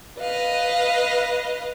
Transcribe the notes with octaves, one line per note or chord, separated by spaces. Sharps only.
B4 D#5 F5